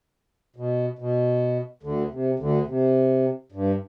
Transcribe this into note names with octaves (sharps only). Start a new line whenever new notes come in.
B2
B2
D2 D3
C3
D2 D3
C3
G2